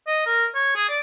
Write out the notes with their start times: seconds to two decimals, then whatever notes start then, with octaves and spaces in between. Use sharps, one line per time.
0.07 D#5
0.26 A#4
0.55 C#5
0.76 G#4
0.89 D5